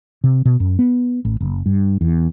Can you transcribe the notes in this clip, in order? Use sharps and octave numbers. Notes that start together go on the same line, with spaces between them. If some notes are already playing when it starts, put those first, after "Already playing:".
C3
B2
F#2
B3
A1
F#1
G2
E2